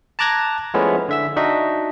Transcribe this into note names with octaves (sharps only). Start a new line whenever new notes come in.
A5 A#5 D6 F#6 G#6 A#6
F3 G#3 A3 B3 C#4 E4
D3 E5 E6
D4 D#4 F#4 D#5 E5